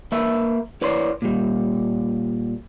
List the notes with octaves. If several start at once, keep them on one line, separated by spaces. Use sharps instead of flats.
A#3 B4 E5
E4 B4 C#5 D5 C6
A#2 G3